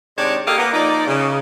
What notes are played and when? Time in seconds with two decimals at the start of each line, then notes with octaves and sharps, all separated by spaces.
0.17 C3 D#3 G#3 D4 C#5 D5
0.45 A#3 G4 A4 A#4 D#5 F5
0.57 A#3 B3
0.73 F3 A#3 D#4 D5
1.06 C#3